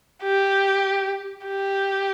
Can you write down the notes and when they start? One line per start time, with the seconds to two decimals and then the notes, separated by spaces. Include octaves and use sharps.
0.23 G4
1.46 G4